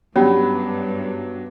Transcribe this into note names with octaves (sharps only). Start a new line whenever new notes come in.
G2 F#3 B3 C#4 D4 G4